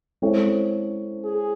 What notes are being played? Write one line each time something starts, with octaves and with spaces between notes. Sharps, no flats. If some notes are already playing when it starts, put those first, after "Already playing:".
G#3 C4 E4 A4 C#5
G#4